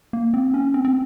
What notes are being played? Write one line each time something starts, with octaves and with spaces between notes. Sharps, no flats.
A#3
C4
C#4
C4
C4